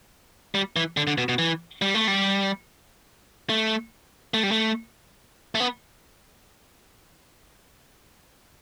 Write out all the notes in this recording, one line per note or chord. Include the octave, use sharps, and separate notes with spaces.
G3
E3
D3
D3
B2
B2
E3
G3
A3
G3
A3
A3
G3
A3
A3
B3